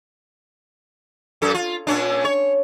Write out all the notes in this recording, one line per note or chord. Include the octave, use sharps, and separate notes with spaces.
F#2 A4
F4
A#2 C#4 D4
C#5